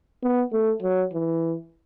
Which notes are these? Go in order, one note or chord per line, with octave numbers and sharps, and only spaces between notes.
B3
A3
F#3
E3